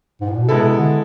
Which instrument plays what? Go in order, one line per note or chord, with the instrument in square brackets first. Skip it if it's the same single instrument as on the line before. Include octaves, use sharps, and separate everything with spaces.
[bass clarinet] G#2
A2
A#2
B2
[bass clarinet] C3 [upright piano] G#3 B3 E4 A4
[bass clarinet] C3
D3